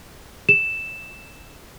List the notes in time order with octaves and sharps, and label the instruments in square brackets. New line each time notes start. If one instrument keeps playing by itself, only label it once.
[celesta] E7